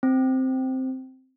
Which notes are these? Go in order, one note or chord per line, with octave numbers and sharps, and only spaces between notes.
C4